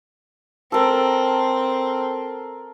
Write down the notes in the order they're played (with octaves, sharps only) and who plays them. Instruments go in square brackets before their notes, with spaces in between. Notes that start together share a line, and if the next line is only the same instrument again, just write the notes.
[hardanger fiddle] C4 [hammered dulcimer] A4 A#4